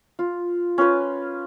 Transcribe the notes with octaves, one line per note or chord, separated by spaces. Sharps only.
F4
C#4 F4 B4